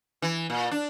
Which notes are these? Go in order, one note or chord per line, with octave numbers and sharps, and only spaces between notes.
E3
A#2
D4